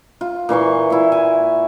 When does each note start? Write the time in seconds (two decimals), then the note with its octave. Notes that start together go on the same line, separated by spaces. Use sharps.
0.21 F4
0.49 A#2 E3 C6 C#6
0.90 A#2 E4
1.12 G#5